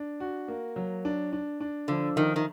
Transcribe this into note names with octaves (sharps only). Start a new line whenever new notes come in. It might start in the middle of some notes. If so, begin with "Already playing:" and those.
Already playing: D4
F#4
A#3
F#3
D4
D4
D4
D3 F3
D#3 F3
D#3